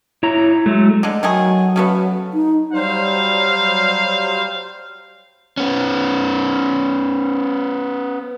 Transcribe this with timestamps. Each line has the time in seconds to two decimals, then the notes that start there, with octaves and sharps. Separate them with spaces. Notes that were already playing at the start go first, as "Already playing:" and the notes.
0.23 E4 C#5 A#5
0.66 F#3 G#3 A3
1.03 D3 G#3
1.23 D#3 F#3 A3 G#4
1.76 C#3 A3 B3
2.34 D#4
2.73 F#3 G3 C5 F5
5.57 B3 C#4